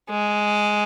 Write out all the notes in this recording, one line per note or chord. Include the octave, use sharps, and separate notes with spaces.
G#3